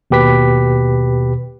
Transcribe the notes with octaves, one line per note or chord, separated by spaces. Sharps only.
D#2 B2 G4 B4 B6